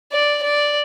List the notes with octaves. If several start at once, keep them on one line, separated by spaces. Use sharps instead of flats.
D5
D5